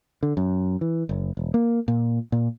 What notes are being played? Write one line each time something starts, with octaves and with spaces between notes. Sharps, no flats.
D3
F#2
E3
F#1
E1
A#3
A#2
A#2